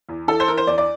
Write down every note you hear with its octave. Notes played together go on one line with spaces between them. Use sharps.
E2
E3 A4
C5
E3 A#4
C5
E2 D5
D5